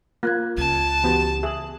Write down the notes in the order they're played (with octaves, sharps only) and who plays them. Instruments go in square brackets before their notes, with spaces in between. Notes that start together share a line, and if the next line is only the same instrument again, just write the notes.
[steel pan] A#3 [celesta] F4 F#6 G#6
[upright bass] C#2 C#3 [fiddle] A5
[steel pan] E3 B3 [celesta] F#4 G4
[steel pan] G#4 [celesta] E5 F#7